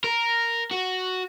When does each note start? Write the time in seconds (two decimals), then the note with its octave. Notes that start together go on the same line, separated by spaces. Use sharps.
0.04 A#4
0.71 F#4